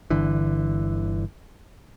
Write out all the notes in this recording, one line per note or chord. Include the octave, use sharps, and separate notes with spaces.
G1 D3 E3